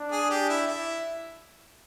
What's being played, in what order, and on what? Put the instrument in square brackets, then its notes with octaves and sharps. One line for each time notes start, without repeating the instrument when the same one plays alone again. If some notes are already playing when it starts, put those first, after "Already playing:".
Already playing: [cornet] D4
[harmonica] G#4
G4
E4
E4